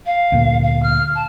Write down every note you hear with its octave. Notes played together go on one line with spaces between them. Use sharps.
F5
D2 A#2
F5
F6
A5